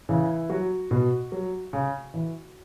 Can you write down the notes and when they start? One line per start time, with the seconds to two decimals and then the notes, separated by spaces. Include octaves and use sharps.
0.09 C#3 E3 E4
0.50 F#3 F#4
0.91 B2
1.32 F#3
1.73 C#3
2.14 E3